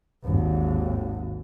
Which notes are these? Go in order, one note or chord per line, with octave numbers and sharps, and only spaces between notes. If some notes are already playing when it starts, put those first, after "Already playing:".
G#1 D#2